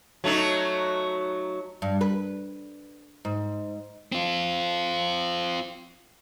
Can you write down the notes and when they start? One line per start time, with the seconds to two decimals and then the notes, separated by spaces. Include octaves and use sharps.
0.24 F#3 A3 D#4
1.82 G2
2.01 B4
3.25 G#2
4.12 C4 F4